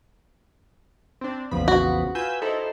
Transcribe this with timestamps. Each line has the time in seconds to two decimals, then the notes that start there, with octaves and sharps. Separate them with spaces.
1.21 C4 D4
1.51 A#1 E2 C#3 F3 B3 B5
1.68 F#4
2.15 F4 B4 G#5 E6 G6
2.42 D#4 E4 A4 C5